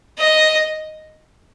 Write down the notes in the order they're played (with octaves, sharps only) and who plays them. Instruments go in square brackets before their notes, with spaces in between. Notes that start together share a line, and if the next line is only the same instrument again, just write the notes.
[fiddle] D#5